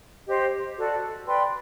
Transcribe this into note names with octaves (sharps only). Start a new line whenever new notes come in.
G4 C5 D#5
F#4 A4 D5
B4 D5 G5 C6